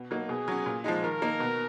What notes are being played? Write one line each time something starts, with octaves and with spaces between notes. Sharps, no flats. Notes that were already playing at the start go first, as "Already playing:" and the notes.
Already playing: B2
F#3 A#3 D#4
B2 G#4
F#3 C#4
A#2
F3 G#3 D#4
D#3 A#4
A#3 D#4
B2